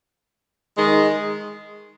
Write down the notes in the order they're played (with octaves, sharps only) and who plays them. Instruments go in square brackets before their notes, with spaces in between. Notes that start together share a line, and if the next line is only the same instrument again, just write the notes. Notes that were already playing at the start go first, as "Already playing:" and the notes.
[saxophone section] D#3 G#3